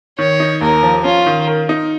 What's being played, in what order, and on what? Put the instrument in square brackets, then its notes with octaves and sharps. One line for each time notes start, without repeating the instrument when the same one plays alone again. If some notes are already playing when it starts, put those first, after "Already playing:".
[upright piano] D#3 [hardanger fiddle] C#5
[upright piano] D#4
[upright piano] D#2 [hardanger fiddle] A#4
[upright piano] F3
[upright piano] C#4 [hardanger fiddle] F4
[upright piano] D#3
A#4
D#4